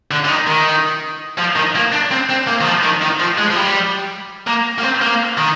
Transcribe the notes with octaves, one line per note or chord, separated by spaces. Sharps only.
D3
D3
D#3
D#3
F3
D#3
A#3
D4
C4
C4
A#3
D#3
F3
D#3
D#3
F3
G#3
F3
G3
A#3
A#3
C4
A#3
D#3